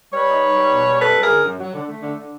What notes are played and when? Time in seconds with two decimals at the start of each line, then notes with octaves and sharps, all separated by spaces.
0.13 G3 B4 C#5
0.28 D#4
0.43 D#4
0.57 G3
0.72 B2
0.87 G3
1.01 F#2 A4 B4
1.15 F#2
1.23 G#4 A#4
1.31 D3
1.45 F#2
1.59 F#3
1.74 D3
1.88 A3
2.02 D3
2.17 D3